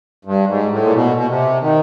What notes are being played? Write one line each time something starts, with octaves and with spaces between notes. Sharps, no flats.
G2
G#2
A2
A#2
B2
B2
C3
D#3